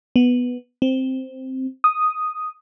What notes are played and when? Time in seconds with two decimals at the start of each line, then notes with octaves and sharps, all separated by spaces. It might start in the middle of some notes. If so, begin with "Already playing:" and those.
0.16 B3
0.82 C4
1.84 D#6